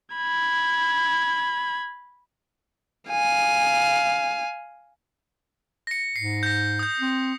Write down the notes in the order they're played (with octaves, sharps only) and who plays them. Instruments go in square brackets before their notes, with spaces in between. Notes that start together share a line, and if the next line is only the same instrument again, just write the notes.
[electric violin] B5 G#6
F5 G#5
[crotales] A#6 C#7
[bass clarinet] G#2 [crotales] C7
[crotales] G6 A#6
D#6 G6
[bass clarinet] C4